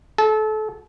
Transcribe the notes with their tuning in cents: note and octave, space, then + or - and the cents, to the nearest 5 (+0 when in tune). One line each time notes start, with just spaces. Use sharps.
A4 -30